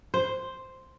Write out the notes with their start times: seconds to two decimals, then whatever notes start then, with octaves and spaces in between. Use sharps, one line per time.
0.14 C5